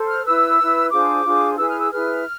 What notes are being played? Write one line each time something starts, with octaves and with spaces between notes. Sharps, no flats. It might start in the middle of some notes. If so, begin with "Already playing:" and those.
Already playing: A4 C5
F6
E4 B4 E6
E4 B4
D4 F4 G#4 C5 D6
D4 F4 G#4 C5
E4 G#4 B4 E6
F6
E6
E4 G#4 B4 F6